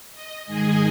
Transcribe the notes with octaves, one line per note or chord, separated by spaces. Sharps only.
D#5
G#2 D#3 G#3 G#4 D#5 G#5